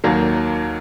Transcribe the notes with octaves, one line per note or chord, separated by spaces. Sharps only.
D#2 D#3 F#3 A#3